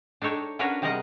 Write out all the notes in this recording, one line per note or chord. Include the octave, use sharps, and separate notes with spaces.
D4 D#4 A4 C#5 G5
C#4 D4 F#4 A#4 B4 C#5
C3 G3 G#4 A#4 D#5 F#5